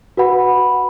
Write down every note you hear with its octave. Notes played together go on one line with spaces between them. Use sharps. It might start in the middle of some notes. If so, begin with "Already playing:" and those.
F#4 B4 F#5 B5